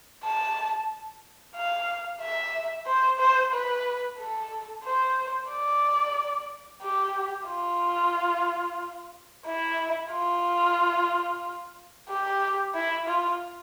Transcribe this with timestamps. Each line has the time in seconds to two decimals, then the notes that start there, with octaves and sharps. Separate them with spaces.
0.24 A5
1.56 F5
2.21 E5
2.86 C5
3.19 C5
3.53 B4
4.19 A4
4.84 C5
5.50 D5
6.82 G4
7.48 F4
9.45 E4
10.12 F4
12.09 G4
12.74 E4
13.08 F4